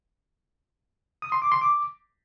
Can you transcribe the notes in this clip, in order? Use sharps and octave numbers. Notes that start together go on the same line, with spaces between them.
D#6
C6
D6
C6
D6